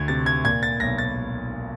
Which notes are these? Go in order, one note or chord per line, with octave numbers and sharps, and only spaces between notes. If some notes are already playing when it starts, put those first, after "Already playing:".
Already playing: D2 G#6
C3 A6
G#6
A#2 G#6
A6
B1 A#6
A6